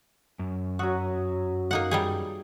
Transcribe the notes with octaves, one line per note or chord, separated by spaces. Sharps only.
F#2
F#3 F#4 E5 D#6
A#3 D#4 F#5
G3 D#4 G#4